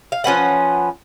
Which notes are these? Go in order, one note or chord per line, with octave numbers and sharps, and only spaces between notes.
F5
F3 C#4 B4 F#5